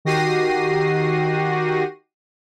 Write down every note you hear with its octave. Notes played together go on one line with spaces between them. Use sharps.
D#3 F#4 G4 A#6 C7 D#7